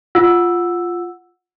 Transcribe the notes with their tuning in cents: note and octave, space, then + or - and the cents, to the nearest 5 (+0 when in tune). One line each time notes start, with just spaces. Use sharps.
F4 +0 F#5 -10 E6 +0